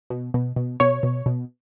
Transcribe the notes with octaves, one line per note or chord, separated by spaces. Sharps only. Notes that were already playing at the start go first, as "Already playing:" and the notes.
B2
B2
B2
B2 C#5
B2
B2